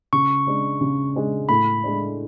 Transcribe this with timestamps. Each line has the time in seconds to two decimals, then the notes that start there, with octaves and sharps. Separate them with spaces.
0.13 C#3 C#6
0.47 G#3 D4
0.81 C#3
1.15 G#3 D4
1.49 A2 B5
1.83 G#3 D4